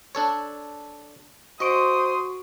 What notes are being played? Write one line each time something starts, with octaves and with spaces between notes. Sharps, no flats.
D4 A4 C#5
F#4 C5 D#5 C6 C#6 D#6 D7